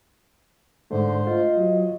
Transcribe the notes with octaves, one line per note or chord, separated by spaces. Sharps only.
G#2 D3 A3 C5
F4 D#5
F#3